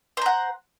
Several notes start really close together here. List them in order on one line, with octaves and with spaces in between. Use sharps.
C5 A#5 F#5